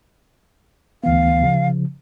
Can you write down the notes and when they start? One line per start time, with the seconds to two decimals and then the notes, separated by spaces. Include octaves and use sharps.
1.04 D2 E3 B3 F5
1.43 C#3 F3